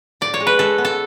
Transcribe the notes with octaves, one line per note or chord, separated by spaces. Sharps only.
A2 D5
C#5
G#3
B4
G#3 A4
B3
A4